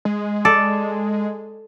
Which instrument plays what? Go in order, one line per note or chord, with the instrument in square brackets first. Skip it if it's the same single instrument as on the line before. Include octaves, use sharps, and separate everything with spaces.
[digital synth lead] G#3
[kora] A4 D5